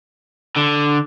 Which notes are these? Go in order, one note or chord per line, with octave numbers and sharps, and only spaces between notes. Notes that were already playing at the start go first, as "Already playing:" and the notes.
D3